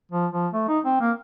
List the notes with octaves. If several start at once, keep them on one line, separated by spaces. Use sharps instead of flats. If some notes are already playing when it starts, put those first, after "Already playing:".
F3
F3
A3
D#4
C4
A#3